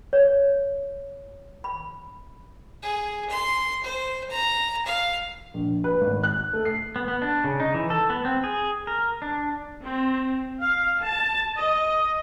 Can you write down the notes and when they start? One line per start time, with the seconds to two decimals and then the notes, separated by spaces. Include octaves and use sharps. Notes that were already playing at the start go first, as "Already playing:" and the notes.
0.13 C#5
1.64 B5
2.83 G#4
3.30 C6
3.84 C5
4.30 A#5
4.86 F5
5.54 A#1
5.84 B4
6.01 G#1
6.23 F#6
6.53 A3
6.65 C7
6.96 B3
7.08 B3
7.22 D4
7.44 C#3
7.60 D#4
7.74 E3
7.90 A4
8.10 B3
8.25 C4
8.44 G#4
8.87 A#4
9.22 D4
9.82 C4
10.61 F5
11.01 A5
11.56 D#5